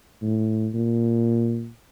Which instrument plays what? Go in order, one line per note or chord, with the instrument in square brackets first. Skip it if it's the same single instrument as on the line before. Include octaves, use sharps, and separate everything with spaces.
[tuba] A2
A#2